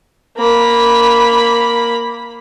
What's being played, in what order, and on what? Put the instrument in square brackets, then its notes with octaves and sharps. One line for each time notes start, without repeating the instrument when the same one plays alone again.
[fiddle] A#3 B5